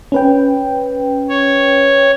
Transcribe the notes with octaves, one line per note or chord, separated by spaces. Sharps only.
C#4 B4 G5
C#5